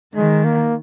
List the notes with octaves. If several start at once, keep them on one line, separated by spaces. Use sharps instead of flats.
D#3 G#3
A#3